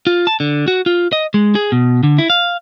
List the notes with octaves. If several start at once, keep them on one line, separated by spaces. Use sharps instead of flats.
F4
A5
D3
F#4
F4
D#5
G#3
G#4
B2
D3
E4
F5